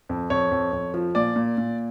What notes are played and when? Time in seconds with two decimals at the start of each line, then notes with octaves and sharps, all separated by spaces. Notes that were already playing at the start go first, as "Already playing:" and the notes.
0.09 F2
0.30 F2 C#5
0.51 F2
0.73 F2
0.94 F3
1.15 A#2 D5
1.36 A#2
1.58 A#2